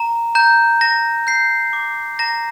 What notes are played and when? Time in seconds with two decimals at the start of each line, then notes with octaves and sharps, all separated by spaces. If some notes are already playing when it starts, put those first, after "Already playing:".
Already playing: A#5
0.35 A#5 G6
0.81 A#5 A#6
1.27 G6 C7
1.73 D6
2.19 A#5 A#6